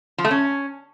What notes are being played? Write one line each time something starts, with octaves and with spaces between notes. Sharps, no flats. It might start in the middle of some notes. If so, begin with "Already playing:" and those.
F3
A3
C#4